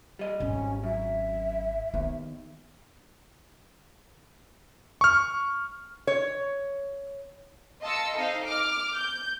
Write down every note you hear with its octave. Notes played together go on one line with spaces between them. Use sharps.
G3 D#5
G#1 C#4
F#2 E5
D#2 B3
C#6 F6
C#5
D#5 F5 A5 C6 E6 C#7
C4 D#4 A4 D#5 F5
D6 F6
G6